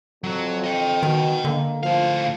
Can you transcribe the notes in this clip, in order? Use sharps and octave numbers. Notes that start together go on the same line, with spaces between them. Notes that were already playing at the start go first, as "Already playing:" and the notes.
F2 F#3 F#4
D#5 G5
B2 D#3
D3 A#3
A2 F3 F5